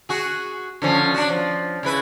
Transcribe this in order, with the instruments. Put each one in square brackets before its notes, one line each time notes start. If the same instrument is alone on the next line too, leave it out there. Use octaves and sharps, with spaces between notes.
[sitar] F#4 G#4
D3 F3 C#4
D4 F#4
F3
C#3 E4 B4